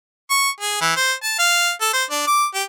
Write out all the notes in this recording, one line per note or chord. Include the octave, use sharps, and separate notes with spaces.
C#6
G#4
E3
C5
A5
F5
A4
C5
D4
D6
G4